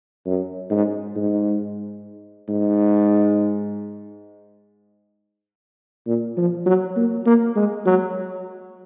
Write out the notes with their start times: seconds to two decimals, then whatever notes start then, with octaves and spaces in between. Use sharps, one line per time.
0.26 F#2
0.70 G#2
1.16 G#2
2.49 G#2
6.07 A#2
6.37 F3
6.66 F#3
6.96 A#3
7.26 A#3
7.56 G#3
7.86 F#3